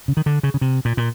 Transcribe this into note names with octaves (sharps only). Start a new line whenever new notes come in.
C#3
D#3
D3
C#3
C#3
C3
A#2
A#2